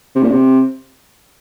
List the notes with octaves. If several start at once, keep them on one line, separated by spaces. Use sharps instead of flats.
C3
A#2
C3